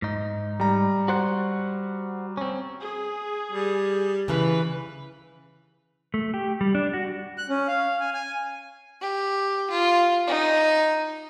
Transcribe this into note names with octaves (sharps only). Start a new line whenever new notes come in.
G#2 D#4
G3 A#5
F#4 C5 F#5
C4 C#4
G#4
G3
C#3 E3 B4
A3
G4
G3
D4
F#4
F#6
C#4
F5
G#5
G#5
G4
F4
D#4